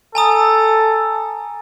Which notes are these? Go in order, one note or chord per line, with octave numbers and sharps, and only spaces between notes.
A4 G#5 A#5 D#6